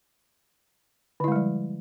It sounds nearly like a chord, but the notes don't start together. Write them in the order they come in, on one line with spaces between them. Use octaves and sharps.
D3 E4 G#3 G3 F3